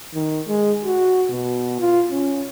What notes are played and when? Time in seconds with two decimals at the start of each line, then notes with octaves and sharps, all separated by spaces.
0.14 D#3
0.47 G#3
0.85 F#4
1.30 B2
1.80 F4
2.12 C#4